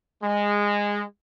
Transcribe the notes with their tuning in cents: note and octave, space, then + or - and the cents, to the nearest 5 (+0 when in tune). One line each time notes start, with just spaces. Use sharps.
G#3 -15